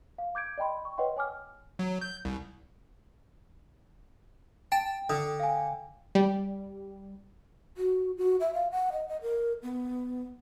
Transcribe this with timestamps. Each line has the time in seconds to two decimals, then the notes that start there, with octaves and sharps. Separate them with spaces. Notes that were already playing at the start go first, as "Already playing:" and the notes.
0.18 F5
0.35 D6 G6 G#6 D7
0.58 D5 D#5 G5 B5 C6
0.85 C#6
0.98 B4 C#5 D#5 F#5 G5 C6
1.17 C#5 G#5 D6 F6
1.79 F#3
2.01 G6
2.25 C2
4.72 G5 A5
5.10 D3 D#6
5.40 F5 G#5
6.15 G3
7.77 F#4
8.17 F#4
8.40 E5
8.54 F5
8.71 F#5
8.92 D#5
9.08 D#5
9.22 A#4
9.63 B3